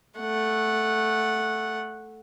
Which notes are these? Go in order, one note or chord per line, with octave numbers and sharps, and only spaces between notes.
A3 F#5